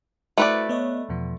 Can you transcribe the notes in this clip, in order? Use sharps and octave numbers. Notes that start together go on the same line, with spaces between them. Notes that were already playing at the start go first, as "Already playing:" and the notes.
A3 E4 F#4 B4 C5 D5
B3 C#5 D#5
E2 B2 F3